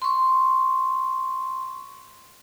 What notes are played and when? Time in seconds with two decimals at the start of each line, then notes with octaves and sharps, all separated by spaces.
0.02 C6 C#6